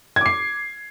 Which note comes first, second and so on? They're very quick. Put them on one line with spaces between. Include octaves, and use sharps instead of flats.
G#6 D6 C7